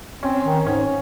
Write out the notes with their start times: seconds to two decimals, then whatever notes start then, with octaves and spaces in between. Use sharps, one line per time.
0.23 C4 C#4
0.45 D#3
0.66 G#2 C#4